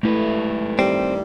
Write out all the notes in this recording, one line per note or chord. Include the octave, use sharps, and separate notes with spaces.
G#2 A3 E4 B4
G2 D#3 G3 C4